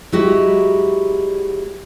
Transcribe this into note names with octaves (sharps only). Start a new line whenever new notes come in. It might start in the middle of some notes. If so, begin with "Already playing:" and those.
F#3 G#3 E4 F#4 G4 D#5